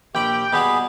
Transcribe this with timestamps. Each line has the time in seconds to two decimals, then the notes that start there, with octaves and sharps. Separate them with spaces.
0.15 A#1 G4 G5 B5
0.53 B2 G3 B3 G#4 B5